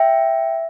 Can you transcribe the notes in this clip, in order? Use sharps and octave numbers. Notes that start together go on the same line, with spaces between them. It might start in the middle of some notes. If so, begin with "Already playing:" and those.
Already playing: E5 G5